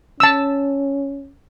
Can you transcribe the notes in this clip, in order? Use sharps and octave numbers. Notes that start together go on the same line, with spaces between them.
C#4 A5 E6